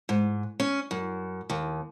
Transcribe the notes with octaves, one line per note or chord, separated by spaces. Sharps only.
G#2
C#4
F#2
D#2